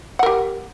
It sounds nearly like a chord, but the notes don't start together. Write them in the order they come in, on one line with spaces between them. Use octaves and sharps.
F#5 A#4 G4